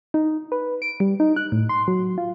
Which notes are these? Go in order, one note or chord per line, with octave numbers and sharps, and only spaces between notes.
D#4
B4
D7
G3
D#4
F#6
A2
C6
F#3
F4